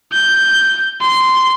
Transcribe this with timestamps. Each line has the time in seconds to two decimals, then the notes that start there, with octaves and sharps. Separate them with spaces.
0.12 G6
1.01 C6